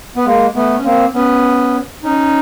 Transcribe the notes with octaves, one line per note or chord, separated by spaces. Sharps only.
B3
G#3 A#3
A3 B3
C#4
A#3 C4
B3 C#4
C#4 D#4